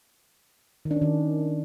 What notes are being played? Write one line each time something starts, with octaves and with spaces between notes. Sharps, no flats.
D#3
D4
C#4
D#3